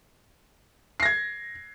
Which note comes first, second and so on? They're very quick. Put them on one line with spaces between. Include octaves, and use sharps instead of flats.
C7 A#6 G#6